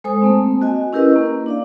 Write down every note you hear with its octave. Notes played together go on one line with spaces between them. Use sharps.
G#3 A4 C5 G#5 D#6
A3 A#3 C4
F#4 D#5 G#5
C#4 E4 G4 A#4 B4 D#5
A#3
D4 D5 F5